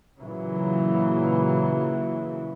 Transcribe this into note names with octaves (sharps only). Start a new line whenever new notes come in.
A#2 C#3 E3 F#3